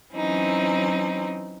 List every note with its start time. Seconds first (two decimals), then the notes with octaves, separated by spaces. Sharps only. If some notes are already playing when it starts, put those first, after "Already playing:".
0.14 E3 F#3 C4 C#4 D#4